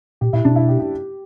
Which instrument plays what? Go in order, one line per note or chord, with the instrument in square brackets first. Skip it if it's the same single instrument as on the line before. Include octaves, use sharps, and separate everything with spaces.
[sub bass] A#2 [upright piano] G4
[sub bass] A#2 [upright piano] E4
[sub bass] B2 [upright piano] D4
[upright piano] E4
G4
G4